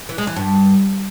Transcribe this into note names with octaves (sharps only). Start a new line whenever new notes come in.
E3
G#3
E3
G2